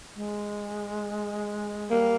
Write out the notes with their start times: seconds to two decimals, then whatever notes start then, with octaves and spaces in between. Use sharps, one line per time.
0.15 G#3
1.90 G3 A#3